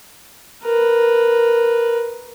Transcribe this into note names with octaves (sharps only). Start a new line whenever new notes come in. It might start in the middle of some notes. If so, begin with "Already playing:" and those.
A#4 B4